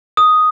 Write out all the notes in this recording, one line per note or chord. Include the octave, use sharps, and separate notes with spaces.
D#6